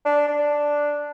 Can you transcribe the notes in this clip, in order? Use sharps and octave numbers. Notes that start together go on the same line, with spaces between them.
D4
D4